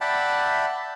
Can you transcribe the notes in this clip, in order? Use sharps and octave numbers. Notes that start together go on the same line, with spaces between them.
D5 E5 F#5 G5 A5 B5